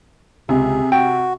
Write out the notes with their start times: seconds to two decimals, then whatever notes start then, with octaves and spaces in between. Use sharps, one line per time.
0.49 C#2 C3 G#4
0.92 F#4 G5